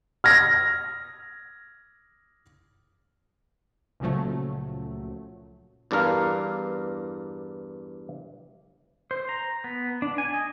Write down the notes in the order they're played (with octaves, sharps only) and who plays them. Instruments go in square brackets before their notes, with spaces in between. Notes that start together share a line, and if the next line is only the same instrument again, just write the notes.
[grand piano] F6 G#6 A#6
[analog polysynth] C#2 A#2 C#3 F3 F#3 A3
[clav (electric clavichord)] E2 G2 D4 A#4 F5
[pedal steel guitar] C5
A#5
B3
D4
G#5
D#5